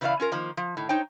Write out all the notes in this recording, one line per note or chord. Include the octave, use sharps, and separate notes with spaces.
C#3 E3 E4 C#5 D5 F5
C#4 F4 A#4
D#3 F3 A#3
F3
A2 D#3
D#4 C5 C#5 G5